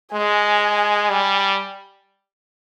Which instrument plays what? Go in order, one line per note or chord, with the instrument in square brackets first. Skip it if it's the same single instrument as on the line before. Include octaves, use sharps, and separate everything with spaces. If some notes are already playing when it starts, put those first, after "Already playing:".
[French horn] G#3 [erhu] G#5
[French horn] G3